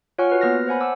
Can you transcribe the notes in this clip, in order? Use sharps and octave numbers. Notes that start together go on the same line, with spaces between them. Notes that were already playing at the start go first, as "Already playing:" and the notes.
F4 C#5 F#5 G#5 C#6 F6
F#4 B4 F6
A#3 B3 B4 F6 A#6
C5 C#5 F#5 G#5 B5
F#5 A5 D6 E6